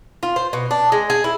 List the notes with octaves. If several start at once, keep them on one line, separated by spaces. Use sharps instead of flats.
F4
C5
B2
D4
G#3
G#4
E4